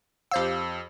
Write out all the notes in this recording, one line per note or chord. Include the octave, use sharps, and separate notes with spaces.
F2 G4 C5 F5 E6